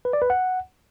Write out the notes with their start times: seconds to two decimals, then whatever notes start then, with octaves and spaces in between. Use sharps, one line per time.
0.05 B4
0.13 D5
0.22 B4
0.30 F#5